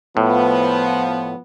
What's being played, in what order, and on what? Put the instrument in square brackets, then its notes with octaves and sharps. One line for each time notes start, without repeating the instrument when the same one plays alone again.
[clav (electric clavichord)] A2 [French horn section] F3 B3